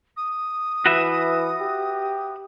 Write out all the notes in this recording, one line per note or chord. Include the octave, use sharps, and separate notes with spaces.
D#6
E3 F#4 B4 E5
G4